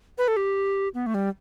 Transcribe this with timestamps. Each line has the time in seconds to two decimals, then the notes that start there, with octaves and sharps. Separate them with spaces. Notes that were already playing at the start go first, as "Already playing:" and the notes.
0.18 B4
0.28 A4
0.37 G4
0.94 B3
1.06 A3
1.14 G3